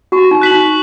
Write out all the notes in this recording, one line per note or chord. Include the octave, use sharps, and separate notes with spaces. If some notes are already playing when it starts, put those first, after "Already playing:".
F#4 C#6
D#4
F#6 B6 F#7
D#4